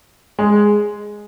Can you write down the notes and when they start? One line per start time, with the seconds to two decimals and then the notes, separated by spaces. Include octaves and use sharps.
0.39 G#3